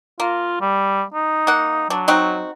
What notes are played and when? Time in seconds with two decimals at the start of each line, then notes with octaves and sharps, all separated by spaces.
0.20 A#3 F4
0.61 G3
1.14 D#4
1.47 A#3 F#5
1.90 F#3 D4
2.08 C4 D#4 F#4